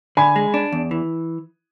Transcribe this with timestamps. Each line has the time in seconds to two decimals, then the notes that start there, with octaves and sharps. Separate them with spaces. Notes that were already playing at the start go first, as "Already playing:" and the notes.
0.17 D3 G#5 B5
0.36 G#3
0.54 D4
0.72 E2
0.91 E3